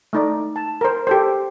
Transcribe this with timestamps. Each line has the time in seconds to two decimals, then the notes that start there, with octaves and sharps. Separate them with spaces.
0.13 A3 D#4 D5
0.56 A5
0.81 A#4 C5
1.07 G4 A4 C5